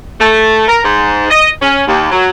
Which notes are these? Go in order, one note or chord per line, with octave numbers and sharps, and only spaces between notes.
A3
A#4
G#2
D#5
C#4
D#2
F#3